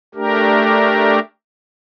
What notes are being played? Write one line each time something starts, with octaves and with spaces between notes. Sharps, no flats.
A3 D4 G4 A#4